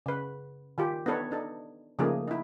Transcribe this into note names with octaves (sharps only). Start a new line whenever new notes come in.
C#3 B4
D#3 F4 G4
B3 D4 D#4 A4 B4 C#5
D4 D#4 A4
C#3 F3 A3 A#3 D#4 G#4
D#4 E4